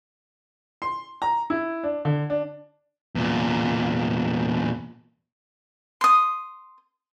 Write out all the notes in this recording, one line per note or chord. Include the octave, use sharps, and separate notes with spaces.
C6
A#5
E4
D4
D3
D4
E2 A#2
C6 D#6